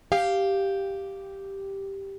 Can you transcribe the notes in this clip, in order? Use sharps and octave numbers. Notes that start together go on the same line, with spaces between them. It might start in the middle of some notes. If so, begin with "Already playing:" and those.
G4 F5